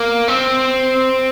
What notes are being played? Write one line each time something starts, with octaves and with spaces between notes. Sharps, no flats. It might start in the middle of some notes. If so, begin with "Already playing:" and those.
Already playing: A#3
C4